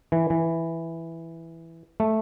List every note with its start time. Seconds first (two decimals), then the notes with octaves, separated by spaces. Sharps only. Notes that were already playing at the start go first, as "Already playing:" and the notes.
0.12 E3
0.30 E3
2.00 A3